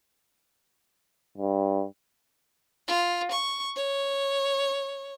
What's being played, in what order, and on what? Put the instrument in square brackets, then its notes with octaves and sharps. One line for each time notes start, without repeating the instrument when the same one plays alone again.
[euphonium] G2
[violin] F4
C#6
C#5